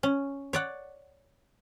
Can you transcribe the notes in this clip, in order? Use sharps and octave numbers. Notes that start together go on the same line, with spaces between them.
C#4
C#5 D5 F#5